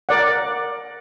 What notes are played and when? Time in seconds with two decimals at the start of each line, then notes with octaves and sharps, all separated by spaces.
0.09 A#4 D5 F#5